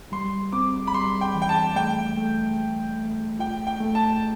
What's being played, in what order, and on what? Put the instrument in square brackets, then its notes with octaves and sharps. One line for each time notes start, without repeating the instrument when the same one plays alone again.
[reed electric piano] G3 [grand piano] C6
[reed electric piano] C4 [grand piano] D6
[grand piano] B5
[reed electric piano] G3 [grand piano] C6
[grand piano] G5
[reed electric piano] E3
[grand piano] G5
A5
[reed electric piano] A3 [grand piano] G5
[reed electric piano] A3
A3
A3
[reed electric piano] F4 [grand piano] G5
[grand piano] G5
[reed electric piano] A3
[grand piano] A5